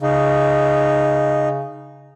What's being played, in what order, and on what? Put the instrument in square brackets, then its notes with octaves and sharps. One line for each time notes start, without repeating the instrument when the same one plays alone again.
[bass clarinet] C#3 [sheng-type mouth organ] D#4